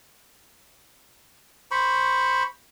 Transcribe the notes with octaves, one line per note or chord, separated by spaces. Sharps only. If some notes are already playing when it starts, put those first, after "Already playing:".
C5 B5 C#6